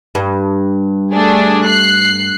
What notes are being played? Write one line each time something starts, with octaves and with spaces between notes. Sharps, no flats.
G2
A3 D4 G#4
F#6 C7